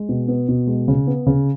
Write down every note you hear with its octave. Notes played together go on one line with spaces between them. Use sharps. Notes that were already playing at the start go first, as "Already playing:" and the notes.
Already playing: G#3
B2
B3
B2
G#3
C#3
B3
C#3